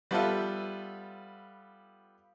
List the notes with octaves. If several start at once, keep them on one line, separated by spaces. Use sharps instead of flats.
G3 B3 F4 A4 B4 E5